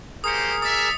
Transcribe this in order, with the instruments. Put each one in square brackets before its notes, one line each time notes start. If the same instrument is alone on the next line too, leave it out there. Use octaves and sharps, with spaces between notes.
[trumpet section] A#3 G4 C5 [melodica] G#4 A#4 [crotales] D#6 C#7
[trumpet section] D5 E5 [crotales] D#6